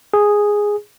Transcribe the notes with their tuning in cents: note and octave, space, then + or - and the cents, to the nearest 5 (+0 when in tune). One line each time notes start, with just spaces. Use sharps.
G#4 -5